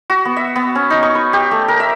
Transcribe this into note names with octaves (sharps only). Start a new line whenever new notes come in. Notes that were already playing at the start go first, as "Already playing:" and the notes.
F#4
B3
E5
B3
C#4
D#4
C#6
B4
G4
A3
A#4
E5